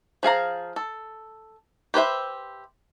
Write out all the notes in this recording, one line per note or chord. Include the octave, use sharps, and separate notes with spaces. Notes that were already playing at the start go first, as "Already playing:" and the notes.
F3 G#4 F5 A#5
A4
G4 B4 C5 E5